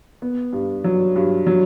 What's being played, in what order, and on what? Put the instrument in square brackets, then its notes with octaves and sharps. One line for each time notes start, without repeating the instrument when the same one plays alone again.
[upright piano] B3
G2
F#3
G2
F#3